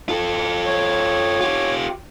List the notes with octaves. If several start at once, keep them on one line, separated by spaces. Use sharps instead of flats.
F4 A4
C#5
F4 G4